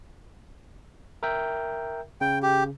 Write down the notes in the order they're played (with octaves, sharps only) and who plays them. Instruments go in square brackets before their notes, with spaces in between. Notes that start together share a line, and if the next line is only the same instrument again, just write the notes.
[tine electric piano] A#4 E5 G5
[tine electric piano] C#3 [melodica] G5
[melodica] G4